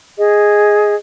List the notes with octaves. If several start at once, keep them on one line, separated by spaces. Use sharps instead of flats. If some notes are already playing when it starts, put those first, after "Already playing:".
G#4 D#5